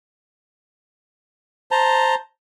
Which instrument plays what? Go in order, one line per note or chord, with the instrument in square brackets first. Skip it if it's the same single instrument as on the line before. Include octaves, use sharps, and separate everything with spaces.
[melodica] C5 A5 A#5